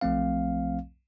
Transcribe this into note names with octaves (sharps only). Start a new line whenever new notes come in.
B1 F3 A3 C4 F5